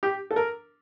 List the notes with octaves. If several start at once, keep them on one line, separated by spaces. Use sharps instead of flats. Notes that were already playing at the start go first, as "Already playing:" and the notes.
G4
A4
A#4